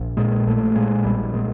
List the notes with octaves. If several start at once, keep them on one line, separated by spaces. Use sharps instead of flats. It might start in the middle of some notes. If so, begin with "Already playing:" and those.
Already playing: A#1
A#2 G#3
A#1 A3
A#2 G#3
A#1 G3
A#2 G#3